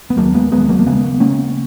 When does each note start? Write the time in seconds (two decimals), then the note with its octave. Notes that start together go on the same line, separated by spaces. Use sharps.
0.10 B3
0.17 D#2 F#3 A#3
0.35 G#3 B3
0.52 D#2 G#3 B3
0.69 F#3 A#3
0.79 A#3
0.86 C#3 G#3 B3
1.20 C#3 A#3 C#4